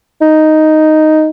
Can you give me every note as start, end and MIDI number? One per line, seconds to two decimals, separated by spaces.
0.21 1.30 63